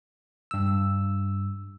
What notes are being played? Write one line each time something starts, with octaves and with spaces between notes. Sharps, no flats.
G2 E6